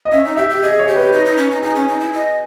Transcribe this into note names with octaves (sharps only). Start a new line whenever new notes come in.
D#5
C#4 E5
D#4
G4 E5
G4
G#4 D#5
C#5
G4
B4
D#4
D#4
C#4
D#4
D#4 G#4
C#4
D#4
E4
D#5